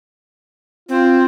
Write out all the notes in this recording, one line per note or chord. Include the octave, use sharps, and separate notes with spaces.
C4 F4